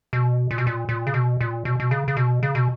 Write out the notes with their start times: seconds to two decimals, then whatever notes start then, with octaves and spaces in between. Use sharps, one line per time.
0.13 B2
0.51 A#2
0.58 B2
0.67 A#2
0.89 A#2
1.07 C#3
1.14 B2
1.41 A#2
1.65 B2
1.80 B2
1.91 C#3
2.08 C#3
2.17 B2
2.43 C#3
2.55 B2